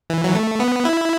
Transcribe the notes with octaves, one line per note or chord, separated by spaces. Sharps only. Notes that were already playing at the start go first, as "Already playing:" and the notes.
E3
F#3
A3
B3
E4